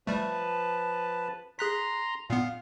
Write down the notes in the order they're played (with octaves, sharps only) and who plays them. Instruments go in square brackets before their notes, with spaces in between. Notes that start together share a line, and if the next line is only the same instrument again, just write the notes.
[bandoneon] F3 B4 A5 [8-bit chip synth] G3 A3
[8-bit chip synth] G#4 F#6 B6 [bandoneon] A#5 C6
[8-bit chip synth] A#2 B3 [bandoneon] F5